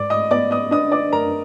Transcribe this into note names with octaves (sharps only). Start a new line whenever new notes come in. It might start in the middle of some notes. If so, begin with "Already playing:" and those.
Already playing: G#2 D5 D6
D#5 D#6
B3 D5 D6
D#5 D#6
D4 D#5 D#6
D5 D6
F#2 A#4 A#5